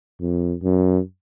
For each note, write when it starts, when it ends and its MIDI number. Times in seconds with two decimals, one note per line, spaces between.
0.21 0.54 41
0.63 0.99 42